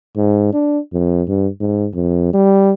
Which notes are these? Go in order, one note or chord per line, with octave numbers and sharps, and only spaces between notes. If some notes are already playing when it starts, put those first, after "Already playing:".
G#2
D4
F2
G2
G#2
F2
G3